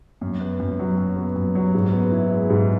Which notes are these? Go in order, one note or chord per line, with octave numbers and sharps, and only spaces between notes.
F#2
B3
F#2
F#3
F#2
B3
F#2
F#3
G#2
B3
E4
G#3
G#2